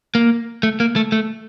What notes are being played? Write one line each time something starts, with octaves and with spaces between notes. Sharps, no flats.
A#3
A3
A#3
A3
A3